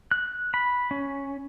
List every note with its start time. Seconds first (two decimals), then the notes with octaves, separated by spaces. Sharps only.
0.11 F#6
0.54 B5
0.91 C#4